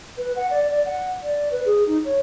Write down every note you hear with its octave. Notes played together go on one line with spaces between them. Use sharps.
B4
F#5
D5
D5
F#5
D5
B4
G#4
D#4
C#5